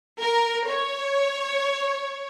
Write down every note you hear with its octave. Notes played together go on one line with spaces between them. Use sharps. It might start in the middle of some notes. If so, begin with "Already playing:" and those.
A#4
C#5